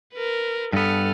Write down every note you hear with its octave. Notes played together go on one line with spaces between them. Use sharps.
A#4 B4
G2 B3 A4 F6